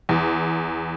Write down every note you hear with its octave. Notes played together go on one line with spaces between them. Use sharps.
E2